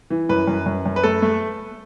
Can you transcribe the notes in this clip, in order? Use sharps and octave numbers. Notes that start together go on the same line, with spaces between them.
E3
F#2 B4
F#2
F#2
F#2
B4
A3 A4
A3